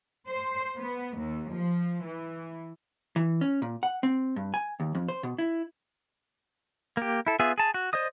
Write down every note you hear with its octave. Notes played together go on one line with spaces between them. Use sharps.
C5
B3
D#2
F3
E3
E3
C#4
A#2
F#5
C4
G2
G#5
D#2
F2
C5
B2
E4
A#3 G4
E4 A4
B3 F4 G#4 E5
G#4 A5
F#4
C5 D5 D#5 D#6